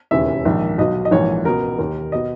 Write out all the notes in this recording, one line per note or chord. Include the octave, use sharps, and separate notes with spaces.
E1 D#2 C#3 E3 E5
A#1 G#2 D#3
B1 B2 D#5
D#5
A#1 G#2 E3 C#5
C#2 B2 A#4
D#2 D#3 A#4
B2 D#5